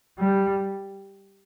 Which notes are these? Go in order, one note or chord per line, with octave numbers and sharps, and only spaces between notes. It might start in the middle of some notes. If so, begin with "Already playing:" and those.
G3